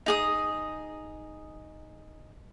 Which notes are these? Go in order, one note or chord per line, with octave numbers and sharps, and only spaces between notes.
D#4 G#4 D#6